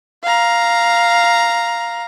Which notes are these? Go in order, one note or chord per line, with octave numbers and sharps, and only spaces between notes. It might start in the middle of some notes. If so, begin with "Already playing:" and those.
F5 A#5